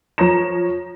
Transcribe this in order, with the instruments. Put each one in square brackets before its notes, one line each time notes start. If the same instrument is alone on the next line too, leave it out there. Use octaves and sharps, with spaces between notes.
[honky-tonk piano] F3 C#5 A#5 A#6 E7